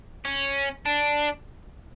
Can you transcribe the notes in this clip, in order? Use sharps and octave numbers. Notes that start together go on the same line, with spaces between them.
C#4
D4